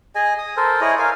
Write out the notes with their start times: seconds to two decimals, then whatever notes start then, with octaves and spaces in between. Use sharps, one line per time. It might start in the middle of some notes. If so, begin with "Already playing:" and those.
0.15 G#4 D#5 G#5
0.38 D#6
0.57 A4 A#4 C5
0.81 E4 G#4 C#5 D#5
0.99 A#4 F5 G#5